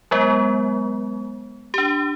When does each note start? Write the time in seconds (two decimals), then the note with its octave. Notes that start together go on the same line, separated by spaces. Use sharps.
0.11 F#3 G#3 B3
1.74 D4 G4